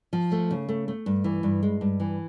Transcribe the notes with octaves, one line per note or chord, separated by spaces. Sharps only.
F3
A3
C#3
A3
A3
G2
E3
G2
G#3
G2
E3